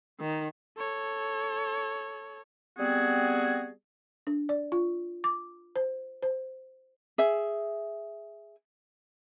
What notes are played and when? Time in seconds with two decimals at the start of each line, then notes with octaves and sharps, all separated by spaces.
0.20 D#3
0.78 A4 C#5
2.79 G3 B3 C4 F#4 G#4
4.27 D4
4.49 D5
4.72 F4
5.24 D6
5.76 C5
6.23 C5
7.18 G#4 E5